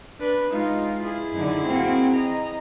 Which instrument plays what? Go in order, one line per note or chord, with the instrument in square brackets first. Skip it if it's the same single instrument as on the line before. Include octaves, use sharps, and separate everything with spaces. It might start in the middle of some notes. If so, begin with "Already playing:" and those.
[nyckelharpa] D4 B4
[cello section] G#3 [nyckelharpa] D#4 [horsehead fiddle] F4
[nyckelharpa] E4 G#4
[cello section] F#2 D3 [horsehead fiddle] D#4
[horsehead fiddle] A#3 F#4 [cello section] C4
[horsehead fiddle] D#5 A#5